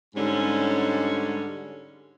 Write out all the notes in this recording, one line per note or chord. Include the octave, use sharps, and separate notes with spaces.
G#2 D3 G3 G#3 C#4